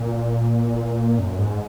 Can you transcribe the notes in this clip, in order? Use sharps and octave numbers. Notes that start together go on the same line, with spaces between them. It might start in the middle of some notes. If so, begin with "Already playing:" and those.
Already playing: A#2
F#2
G#2